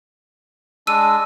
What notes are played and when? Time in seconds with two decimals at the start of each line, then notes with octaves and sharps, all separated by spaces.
0.87 G#3 D4 E6 D#7